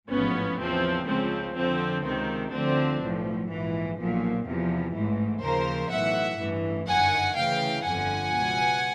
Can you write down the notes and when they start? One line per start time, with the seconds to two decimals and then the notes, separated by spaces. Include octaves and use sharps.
0.10 A1 G#2 F3 B3 C#4
0.58 E2 C#3 F3 C4
1.07 C#2 C#3 F3 C4
1.56 F2 D3 F3 C4
2.04 C#2 C3 D#3 C4
2.52 D2 D3 F3 C4 D4
3.00 B1 A2 F3
3.49 A#1 G#2 E3
3.98 B1 A#2 F3
4.46 E2 C3 F3
4.94 A1 G#2 E3
5.42 D#2 C#3 F3 A#4 C5
5.91 B1 A2 E3 E5 F#5
6.39 A1 G2 E3
6.87 G1 F#2 D#3 F#5 G#5
7.36 D2 C#3 E3 F5 G5
7.84 G1 F2 D3 F3 F#5 G#5
8.33 C#2 B2